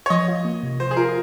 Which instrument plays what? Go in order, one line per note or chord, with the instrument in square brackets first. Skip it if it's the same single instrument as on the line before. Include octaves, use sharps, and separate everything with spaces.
[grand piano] C#5
[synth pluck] F3 [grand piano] D#5
[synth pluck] F4
A#3
C3
[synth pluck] F3 [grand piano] C5
[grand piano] G#4
[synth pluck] F4 [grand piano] A#4